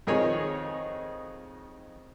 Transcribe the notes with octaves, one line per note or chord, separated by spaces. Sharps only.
F2 D#3 D#4 G#4 C#5 G#5